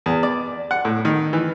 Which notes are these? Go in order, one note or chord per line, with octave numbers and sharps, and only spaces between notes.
E2
D5
F#5
A2
D#3
E3